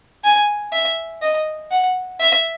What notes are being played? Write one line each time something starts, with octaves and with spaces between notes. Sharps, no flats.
G#5
E5
D#5
F#5
E5